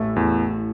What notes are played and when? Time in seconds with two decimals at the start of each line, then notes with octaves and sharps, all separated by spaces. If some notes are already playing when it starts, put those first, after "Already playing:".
Already playing: A1 A2 A3 E4
0.16 E2